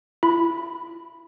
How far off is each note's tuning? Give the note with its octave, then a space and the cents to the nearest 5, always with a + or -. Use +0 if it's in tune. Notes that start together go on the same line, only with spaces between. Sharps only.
E4 +35 B5 +0